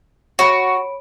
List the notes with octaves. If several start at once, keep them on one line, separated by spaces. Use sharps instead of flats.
F#4 C#5 B5 D7